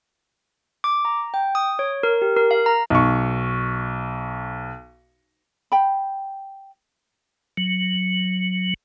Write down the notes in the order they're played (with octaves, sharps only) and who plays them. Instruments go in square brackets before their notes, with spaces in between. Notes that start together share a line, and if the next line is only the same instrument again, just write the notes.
[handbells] D6
A#5
G5
D#6
C#5
A#4
G4
A#4
F5
A#5
[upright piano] B1 C#6
[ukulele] G5 B5
[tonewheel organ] F#3